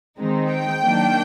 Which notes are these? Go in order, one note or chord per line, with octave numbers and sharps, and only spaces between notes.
D#3 G#3 C4 D#4
G5
D#3 F#3 A#3 D4